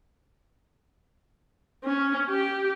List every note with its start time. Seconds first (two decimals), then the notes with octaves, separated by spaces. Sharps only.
1.84 C#4
2.29 G4